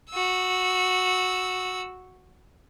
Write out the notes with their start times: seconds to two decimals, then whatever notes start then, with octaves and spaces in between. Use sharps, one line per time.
0.10 F#4 E6